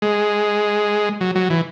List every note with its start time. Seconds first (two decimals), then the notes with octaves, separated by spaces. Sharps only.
0.02 G#3
1.21 F#3
1.35 F#3
1.50 E3